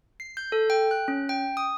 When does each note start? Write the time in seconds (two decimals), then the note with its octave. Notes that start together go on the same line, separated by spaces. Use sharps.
0.20 C7
0.37 G6
0.52 A4
0.70 G5
0.91 F#6
1.08 C#4
1.29 G5
1.57 D#6